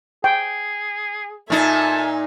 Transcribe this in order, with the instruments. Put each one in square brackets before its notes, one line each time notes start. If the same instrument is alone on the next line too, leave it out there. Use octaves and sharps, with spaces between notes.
[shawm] G#4 [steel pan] G5
[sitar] A#2 D#4 [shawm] A4 [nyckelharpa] E5 G#5